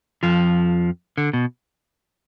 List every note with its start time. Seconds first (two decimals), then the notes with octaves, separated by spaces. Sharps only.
0.23 F2 F3
1.18 D3
1.33 B2